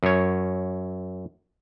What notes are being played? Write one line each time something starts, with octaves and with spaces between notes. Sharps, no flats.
F#2 C#5